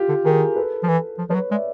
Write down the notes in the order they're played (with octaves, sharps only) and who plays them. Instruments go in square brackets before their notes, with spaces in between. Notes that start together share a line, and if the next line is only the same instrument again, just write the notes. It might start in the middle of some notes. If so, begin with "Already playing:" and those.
Already playing: [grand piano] F4 G4
[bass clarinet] D3
[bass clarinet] D#3 [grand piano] G#4 A#4
[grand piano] A4 B4
[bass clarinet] F3
E3
F3
[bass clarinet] F3 [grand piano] B4 C#5
[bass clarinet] F#3
[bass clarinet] G#3 [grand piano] D5 E5